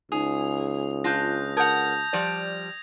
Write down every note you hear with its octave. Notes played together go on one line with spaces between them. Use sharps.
C#2 D#4 G#4 D#6
D4 F4 A5 G6 A#6
A#4 F#5 A5 D#6 G6 G#6 F7
F3 G3 D5